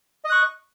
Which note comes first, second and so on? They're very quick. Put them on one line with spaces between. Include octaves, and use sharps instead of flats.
D#5 D#6 F#6 C#6